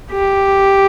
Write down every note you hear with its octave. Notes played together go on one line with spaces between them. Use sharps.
G4